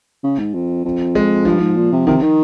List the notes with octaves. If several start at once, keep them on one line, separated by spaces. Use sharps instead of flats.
C#3
G#2
F2
F2
G#3
G2 F3
G#2
A#2
C3
C3 D#3
D#3